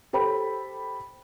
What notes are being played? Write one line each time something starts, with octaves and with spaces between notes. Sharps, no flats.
G4 A4 C5 G5 B5